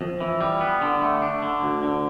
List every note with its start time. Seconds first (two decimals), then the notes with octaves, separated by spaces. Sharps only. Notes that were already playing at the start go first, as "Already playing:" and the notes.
0.01 F2
0.20 E3
0.41 G3
0.61 B3
0.81 D3
1.02 A3
1.22 D4
1.42 D3
1.63 D2
1.83 D3